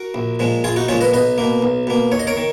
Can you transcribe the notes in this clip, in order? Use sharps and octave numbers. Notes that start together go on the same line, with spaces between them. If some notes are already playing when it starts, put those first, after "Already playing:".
Already playing: F#4 A#4
A#1
A#2 F3 G#3
A#1 F4 G#4
D#4 F#4
A#2 F3 G#3 C#4 F4
B4 D#5
B1 B4 D#5
B2 A#3
B1
B2 A#3
D#2 C#5
D#5
A#4 C#5
D#3